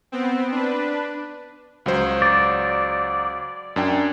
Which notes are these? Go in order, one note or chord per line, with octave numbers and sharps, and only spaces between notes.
B3 C4
D4 B4
C#2 F#3 C5
D5
F#2 D4 G5